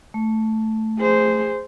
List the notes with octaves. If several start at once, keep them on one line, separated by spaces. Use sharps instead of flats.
A3
G#4 C5